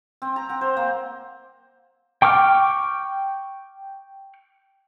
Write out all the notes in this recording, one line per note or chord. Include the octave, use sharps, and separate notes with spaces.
C4
A#5
F#5
C5
A#3
G5 C#6 D6 F6